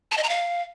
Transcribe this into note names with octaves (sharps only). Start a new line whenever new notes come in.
A5
D#5
A#5
F5